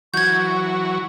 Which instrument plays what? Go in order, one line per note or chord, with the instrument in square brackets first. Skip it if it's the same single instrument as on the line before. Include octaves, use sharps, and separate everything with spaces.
[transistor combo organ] E3 F#3 F#4 [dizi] C#6 [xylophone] G6 G#6